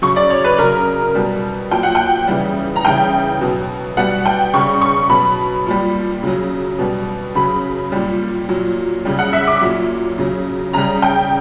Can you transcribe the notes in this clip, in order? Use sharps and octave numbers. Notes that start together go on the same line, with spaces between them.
C#3 F#3 C#6
D5
C#5
B4
C#3 F#3 A#4
B2 G3
A#2 F#3 G5
F#5
G5
C#3 E3 G3
A#5
C#3 E3 G3 G5
B2 F#3
B2 G3 F#5
G5
C#3 G3 C#6
C#6
B2 F#3 B5
A#2 G3
C#3 F#3
B2 G3
C#3 F#3 B5
A#2 G3
A#2 F#3
C#3 G3
F#5
E5
D6
A#2 F#3
C#3 F#3
C#3 G3 A#5
G5